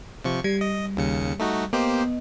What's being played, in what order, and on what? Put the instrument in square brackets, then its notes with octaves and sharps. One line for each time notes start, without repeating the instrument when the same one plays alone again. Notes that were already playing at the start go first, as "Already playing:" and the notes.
[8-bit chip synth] C3 F3 C#6
[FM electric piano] G3 [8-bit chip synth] G#6
[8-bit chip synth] D#5
D#2 C#3 C#7
A3 D#4 F#4
[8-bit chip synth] A#3 G4 C5 [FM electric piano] B3 D#5